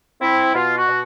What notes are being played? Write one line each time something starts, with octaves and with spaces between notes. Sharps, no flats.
C4 E4
B2 F4
F#4
B2